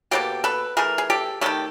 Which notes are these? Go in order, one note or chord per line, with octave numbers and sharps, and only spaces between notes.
B2 G3 A#3 G4 A4
A4 B4
E3 A3 G#4 A#4
G#4
G4 A4
D#3 F#3 A3 G4 A4